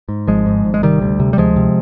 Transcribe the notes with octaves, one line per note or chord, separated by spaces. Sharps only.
G#2
G#1 F3 G#3
G#2
G#1
G#3
C3 D#3 G3
D2
C3
G3
D2 F3 G#3
C3